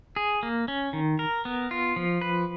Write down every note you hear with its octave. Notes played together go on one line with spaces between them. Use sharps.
G#4
A#3
C#4
D#3
A#4
B3
F4
F3
B4